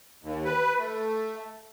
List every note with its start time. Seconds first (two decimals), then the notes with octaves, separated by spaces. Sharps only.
0.23 D#2
0.45 B4
0.78 A3